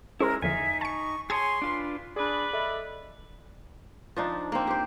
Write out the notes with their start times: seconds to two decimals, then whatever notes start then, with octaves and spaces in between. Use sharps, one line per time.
0.20 G#3 C#4 E4 G#4 A#4 C5
0.42 E2 D3 F3 D#4 E5 G#5
0.81 A5 C#6 C#7
1.30 G#4 C#5 G#5 A5 C6 D#6 G#6
1.62 D4 F4 B4
2.16 D4 G#4 B4 D5 B5
2.53 A4 D#5 E5
4.16 F3 D4 D#4
4.52 A#3 C4
4.67 G4 C5